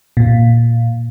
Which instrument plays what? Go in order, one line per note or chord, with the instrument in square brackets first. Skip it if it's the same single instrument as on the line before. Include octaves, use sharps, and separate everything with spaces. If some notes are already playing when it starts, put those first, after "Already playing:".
[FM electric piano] A#2